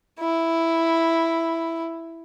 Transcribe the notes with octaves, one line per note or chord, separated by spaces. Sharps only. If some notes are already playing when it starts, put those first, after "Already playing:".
E4